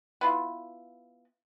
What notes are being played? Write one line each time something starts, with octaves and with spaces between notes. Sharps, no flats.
B3 E4 F4